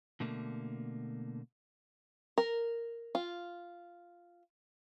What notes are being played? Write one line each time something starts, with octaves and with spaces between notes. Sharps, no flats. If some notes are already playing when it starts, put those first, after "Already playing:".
B2 D3 A3 A#3
A#4
F4